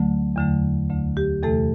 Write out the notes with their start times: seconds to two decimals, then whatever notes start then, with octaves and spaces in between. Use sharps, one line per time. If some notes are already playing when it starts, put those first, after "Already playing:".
Already playing: D2 D3 F#3 A3
0.36 E2 D3 F#3 A3
0.90 D2 D3 A3
1.17 G4
1.43 E2 C3 E3 A3 A4